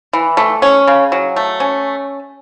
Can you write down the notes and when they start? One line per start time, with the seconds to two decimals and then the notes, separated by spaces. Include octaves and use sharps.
0.13 E3
0.37 A3
0.62 C#4
0.87 C#3
1.12 F#3
1.36 A3
1.60 C#4